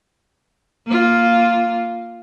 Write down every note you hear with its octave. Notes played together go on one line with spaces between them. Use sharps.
A#3 F4